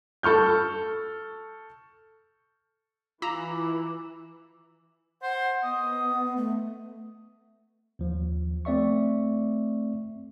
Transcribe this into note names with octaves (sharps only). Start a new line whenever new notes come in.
A4 C#6 F6 G6
E3 F4 A#5 D6 E6
C5 F#5
B3 D#5
A3
D#2 F3
A3 C4 D5 E5 C#6